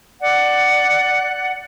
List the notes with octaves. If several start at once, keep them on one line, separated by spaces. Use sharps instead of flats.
D5 F#5